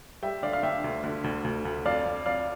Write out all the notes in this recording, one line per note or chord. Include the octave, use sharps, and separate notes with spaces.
G3 E5 G5
D3 D5 F5
F5
D3 E5 G5
D2
D3
D2
D2
D2
F2 D5 F5
F2
F2 D5 F5